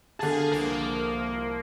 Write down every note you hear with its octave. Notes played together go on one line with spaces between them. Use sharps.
D3 G#4 F5 A5
C2 F3 A#3